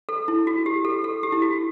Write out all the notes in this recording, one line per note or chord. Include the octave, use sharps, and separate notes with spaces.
A4
E4
F#4
G4
A4
A4
G4
E4
F#4